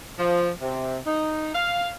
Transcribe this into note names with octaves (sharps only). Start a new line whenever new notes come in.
F3
C3
D#4
F5